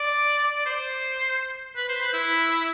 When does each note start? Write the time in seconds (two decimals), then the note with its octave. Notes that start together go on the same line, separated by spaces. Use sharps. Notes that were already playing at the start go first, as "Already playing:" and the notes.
Already playing: D5
0.58 D5
0.66 C5
1.76 B4
1.89 C5
2.01 B4
2.14 E4